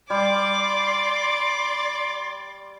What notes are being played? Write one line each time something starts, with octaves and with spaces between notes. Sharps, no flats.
G3 D5 C6 D6